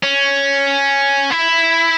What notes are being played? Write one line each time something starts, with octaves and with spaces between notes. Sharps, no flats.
C#4
E4